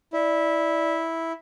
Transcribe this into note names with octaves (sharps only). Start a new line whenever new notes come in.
E4 D5